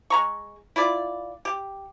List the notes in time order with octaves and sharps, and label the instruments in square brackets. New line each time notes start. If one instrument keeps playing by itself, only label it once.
[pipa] G#3 A#5 C#6
E4 F4 D5
G4